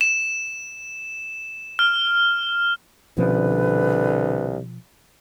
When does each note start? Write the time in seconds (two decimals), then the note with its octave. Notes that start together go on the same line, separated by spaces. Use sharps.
0.01 E7
1.79 F6
3.18 C2 B2 D3 F3 C#4 B4